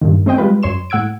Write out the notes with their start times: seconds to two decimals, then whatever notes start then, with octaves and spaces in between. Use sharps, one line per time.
0.01 G2 A#2 D#3
0.26 A3 C4 C5 D#5 G5
0.38 G3 G#3 F4 B4
0.63 F#2 C#5 C6 E7
0.90 A2 F#5 E6 G#6 D7